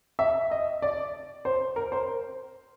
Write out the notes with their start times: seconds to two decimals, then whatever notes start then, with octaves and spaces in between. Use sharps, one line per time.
0.19 E5
0.51 D#5
0.82 D5
1.45 C5
1.76 A#4
1.92 C5